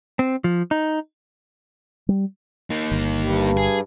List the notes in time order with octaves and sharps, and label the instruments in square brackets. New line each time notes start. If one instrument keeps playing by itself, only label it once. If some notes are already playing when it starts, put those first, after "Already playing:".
[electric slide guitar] C4
F3
D#4
[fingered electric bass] G3
[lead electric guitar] A#3 D#4
[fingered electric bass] G1
[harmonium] G2
[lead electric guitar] G#4